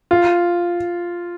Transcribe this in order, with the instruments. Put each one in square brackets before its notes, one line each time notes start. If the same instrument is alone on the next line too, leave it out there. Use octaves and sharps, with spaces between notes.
[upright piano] F4